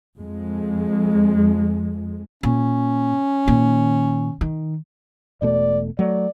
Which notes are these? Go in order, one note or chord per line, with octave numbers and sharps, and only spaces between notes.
F2 G#3
A#2 C#4
A#2 D#3
D#3
E1 B2 A3 D5
F#3 A3 D5